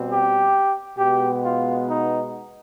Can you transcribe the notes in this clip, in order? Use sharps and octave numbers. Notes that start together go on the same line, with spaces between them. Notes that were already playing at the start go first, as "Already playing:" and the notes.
Already playing: B2 G3 C4
G4
B2 G#3 B3 G4
F4
D#4